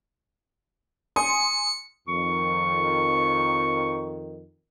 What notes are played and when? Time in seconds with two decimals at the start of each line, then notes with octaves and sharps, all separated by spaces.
1.16 G#5 C6 D#6 C#7
2.08 F2 D#3 C#6